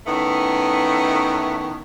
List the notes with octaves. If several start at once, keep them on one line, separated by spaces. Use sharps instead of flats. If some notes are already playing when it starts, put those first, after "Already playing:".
D#3 A3 B3 C#4 E4